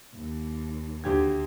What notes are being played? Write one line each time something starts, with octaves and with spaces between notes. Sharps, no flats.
D#2
D2 G4 G#6